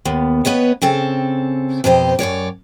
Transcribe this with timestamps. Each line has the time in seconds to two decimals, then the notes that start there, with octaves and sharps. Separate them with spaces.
0.05 D#2 B3
0.45 B3 B4 C#5 D#5
0.82 C#3 C4 A4
1.84 F2 B2 G4 C5 D#5
2.19 F#2 E3 C#5 D5